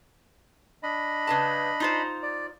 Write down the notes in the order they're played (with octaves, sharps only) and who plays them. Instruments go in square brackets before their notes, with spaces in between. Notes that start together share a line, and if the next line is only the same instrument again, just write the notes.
[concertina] D4 D#5 B5
[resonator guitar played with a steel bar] C#3 B4 A5
D#4 F4 C5
[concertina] D5